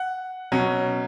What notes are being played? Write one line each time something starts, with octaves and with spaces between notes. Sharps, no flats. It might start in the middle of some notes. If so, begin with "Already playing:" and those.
Already playing: F#5
B2 F#3 C#4